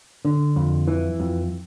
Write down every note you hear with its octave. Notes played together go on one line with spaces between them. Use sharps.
D3
F2
E3
F2